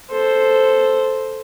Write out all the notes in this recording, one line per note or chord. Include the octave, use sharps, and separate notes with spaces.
A4 C5